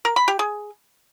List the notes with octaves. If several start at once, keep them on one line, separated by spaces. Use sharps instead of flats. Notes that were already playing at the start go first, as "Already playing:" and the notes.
A#4
B5
G4
G#4